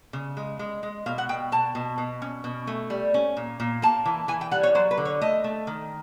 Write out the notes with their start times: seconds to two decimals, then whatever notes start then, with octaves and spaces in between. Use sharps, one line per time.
0.13 C#3
0.37 G#3
0.59 G#3
0.83 G#3
1.06 B2 F5
1.18 F#5
1.29 B2 G5
1.52 B2 A5
1.75 B2
1.98 B2
2.22 C#4
2.44 B2
2.67 A3
2.90 G3
3.14 C#4
3.37 A#2
3.60 A#2
3.82 A#3 A5
4.06 E3
4.28 E3 G#5
4.41 G5
4.51 G3 F#5
4.63 C#5
4.75 F#3 C5
4.91 B4
4.98 D3
5.05 C#5
5.21 A3 D#5
5.44 A3
5.67 D#3